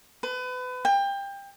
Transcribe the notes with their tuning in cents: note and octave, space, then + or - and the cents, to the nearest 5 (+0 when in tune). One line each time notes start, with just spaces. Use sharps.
B4 +30
G5 +25